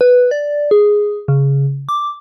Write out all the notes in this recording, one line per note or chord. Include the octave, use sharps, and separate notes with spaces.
B4
D5
G#4
C#3
D6